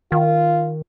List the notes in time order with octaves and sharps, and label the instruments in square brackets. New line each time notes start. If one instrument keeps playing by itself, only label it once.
[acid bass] D#3 [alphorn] F4